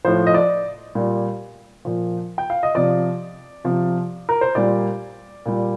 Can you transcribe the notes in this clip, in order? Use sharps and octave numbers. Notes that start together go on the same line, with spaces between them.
A2 F3 C5
D#5
D5
A#2 G3
A#2 F3
G5
F5
D#5
C3 F3 D5
C3 F3
A#4
C5
A#2 G3 D5
A#2 G3